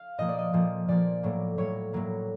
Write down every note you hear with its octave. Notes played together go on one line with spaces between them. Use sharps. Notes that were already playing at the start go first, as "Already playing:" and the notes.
Already playing: F5
A#2 F3 A#3 D#5
D5
D#5
A#2 F3 A#3
A#2 F3 A#3 D5
A2 F#3 A#3
A2 F#3 A#3 C#5
A2 F#3 A#3